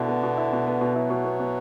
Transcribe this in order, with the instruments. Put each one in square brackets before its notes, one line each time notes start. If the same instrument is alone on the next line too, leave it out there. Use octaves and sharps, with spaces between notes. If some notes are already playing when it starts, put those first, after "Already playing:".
Already playing: [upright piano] B2 E4 [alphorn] D3
[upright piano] B3
B2
E4
B2
B3
B2
[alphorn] F#3 [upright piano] E4
[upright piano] B2
B3
B2